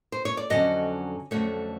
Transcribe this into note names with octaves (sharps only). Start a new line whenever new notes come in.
C5
C#5
D5
F2 D3 F#3 C#4 D#5
F2 D3 F#3 A3 C#4 C#5